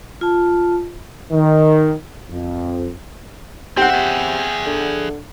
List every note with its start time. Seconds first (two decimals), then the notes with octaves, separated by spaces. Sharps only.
0.21 F4 A5
1.31 D#3
2.30 F2
3.77 B1 C4 G4 F#5
3.90 C3 G#4 E5
4.66 D3